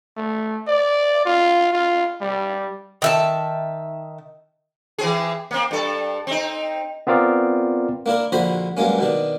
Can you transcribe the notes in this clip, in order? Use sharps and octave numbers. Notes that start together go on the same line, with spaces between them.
A3
D5
F4
F4
G3
D#3 E5 A5
E3 C4 G#4
A#3 C4
G2 A4
C4 D#4
B3 C4 F4 A#4 D5
A#3 D4 E4 A#4
A#1 D3 F#4 C5 A#5 B5
G2 F#3 G#3 A#3 C#4
B2 D#3 D4